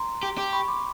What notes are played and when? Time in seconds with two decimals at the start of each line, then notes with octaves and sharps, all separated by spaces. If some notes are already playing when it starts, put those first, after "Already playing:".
Already playing: A#5 C6
0.23 G4
0.38 G4
0.52 B5 C#6
0.68 C6 D6